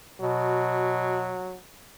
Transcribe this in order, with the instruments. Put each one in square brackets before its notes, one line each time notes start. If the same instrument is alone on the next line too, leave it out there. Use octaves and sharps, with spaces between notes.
[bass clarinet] B2 [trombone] F#3